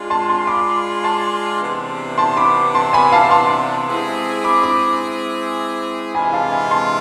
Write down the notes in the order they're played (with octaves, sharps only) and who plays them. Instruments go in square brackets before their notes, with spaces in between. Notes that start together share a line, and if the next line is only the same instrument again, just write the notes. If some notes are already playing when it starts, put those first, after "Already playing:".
Already playing: [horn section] G#3 D4 F4
[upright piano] A5 C6
A5 C6
B5 D6
A5 C6
[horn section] C3 E3 B3 D4
[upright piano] A5 C6
B5 D6
A5 C6
G#5 B5
F5 A5
A5 C6
[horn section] G#3 C4 E4 G#4
[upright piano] B5 D6
B5 D6
[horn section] C3 E3 G#3 D4 F4 [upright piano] G#5 B5
[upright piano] F5 A5
G#5 B5
A5 C6